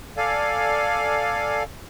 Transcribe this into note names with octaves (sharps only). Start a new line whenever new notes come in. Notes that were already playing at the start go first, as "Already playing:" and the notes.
A4 D5 F5 G#5